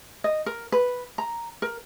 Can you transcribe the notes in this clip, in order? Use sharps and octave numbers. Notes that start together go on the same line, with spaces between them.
D#5
A#4
B4
A#5
A#4